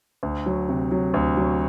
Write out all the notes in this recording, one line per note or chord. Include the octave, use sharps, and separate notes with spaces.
D2
F#3
C3
F#3
D2
F#3